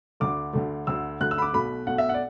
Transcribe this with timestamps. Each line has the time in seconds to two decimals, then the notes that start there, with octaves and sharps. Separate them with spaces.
0.20 D2 D3 A3 D6
0.53 D2 D3 A3
0.87 D2 D3 A3 E6
1.20 D2 D3 A3 F#6
1.31 E6
1.38 B5
1.42 D6
1.53 B1 B2 A3 B5
1.87 B1 B2 A3 F#5
1.98 E5
2.09 F#5
2.14 D5